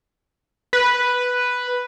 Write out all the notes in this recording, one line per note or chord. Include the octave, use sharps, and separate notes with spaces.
B4